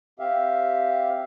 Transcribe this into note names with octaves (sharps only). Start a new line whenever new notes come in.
C4 G4 E5 F5